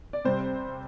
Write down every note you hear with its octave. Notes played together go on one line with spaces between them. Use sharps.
D5
C3 G3 C4 C5